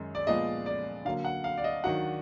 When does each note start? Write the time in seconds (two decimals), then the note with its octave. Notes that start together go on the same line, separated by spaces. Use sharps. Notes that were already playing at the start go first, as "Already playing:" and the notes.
Already playing: F#2 D#3 G#3 D#4
0.15 D5
0.27 A#2 F3 G#3 B3 F4 D#5
0.66 D5
1.05 D3 F#3 A#3 F5
1.25 F#5
1.44 F5
1.58 D5
1.64 D#5
1.84 D#3 F#3 D4 F#4 F#5